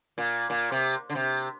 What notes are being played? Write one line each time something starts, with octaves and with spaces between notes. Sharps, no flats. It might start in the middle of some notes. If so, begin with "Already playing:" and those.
A#2
A#2
C3
D3
C3